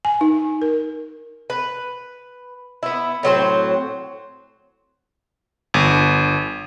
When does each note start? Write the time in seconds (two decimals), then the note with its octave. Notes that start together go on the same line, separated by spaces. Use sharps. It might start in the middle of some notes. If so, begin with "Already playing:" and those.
0.05 G#5
0.21 D#4
0.62 A#4
1.50 B4
2.83 B3 E4
3.23 A2 F#3 C4 C5
5.74 G1